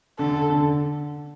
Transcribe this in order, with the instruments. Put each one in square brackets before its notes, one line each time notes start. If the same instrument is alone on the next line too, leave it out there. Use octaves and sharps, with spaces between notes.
[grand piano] D3 [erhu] A4
[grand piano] D3